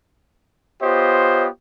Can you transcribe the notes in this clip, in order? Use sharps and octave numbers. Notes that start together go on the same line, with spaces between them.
B3 F4 G4 C5 C#5 D#5